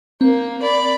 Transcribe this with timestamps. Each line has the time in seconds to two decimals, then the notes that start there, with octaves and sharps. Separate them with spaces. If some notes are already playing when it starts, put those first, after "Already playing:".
0.21 A#3 C4
0.62 D5 B5